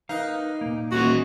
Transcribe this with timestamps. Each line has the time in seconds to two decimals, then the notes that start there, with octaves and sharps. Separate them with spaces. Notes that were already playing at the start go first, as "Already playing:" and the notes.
0.09 D#4 A#4 B4 F5
0.61 A#2 A#3
0.92 D#1 E3 G#3 F#4